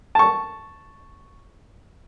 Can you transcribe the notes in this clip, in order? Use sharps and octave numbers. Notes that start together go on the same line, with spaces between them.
A5 C#6